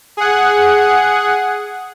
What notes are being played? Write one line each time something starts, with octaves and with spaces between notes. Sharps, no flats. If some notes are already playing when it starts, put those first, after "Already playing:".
G#4 F#5